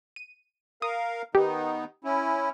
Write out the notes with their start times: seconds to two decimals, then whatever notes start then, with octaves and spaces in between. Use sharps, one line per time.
0.16 D#7
0.82 A#4 F5 D#6
1.35 D#3 B3 D#4 G4
2.04 C#4 E4